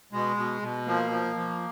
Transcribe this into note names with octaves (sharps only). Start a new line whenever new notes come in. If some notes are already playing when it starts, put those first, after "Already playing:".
B2 G#3
B2
B2
F3 A#3
F3
F3